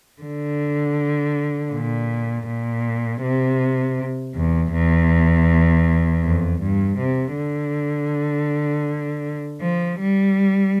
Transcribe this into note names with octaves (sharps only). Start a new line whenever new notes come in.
D3
A#2
A#2
C3
E2
E2
F2
G2
C3
D3
F3
G3